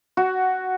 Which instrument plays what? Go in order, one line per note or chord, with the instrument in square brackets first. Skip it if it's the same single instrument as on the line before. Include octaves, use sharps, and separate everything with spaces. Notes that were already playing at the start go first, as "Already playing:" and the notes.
[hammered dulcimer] F#4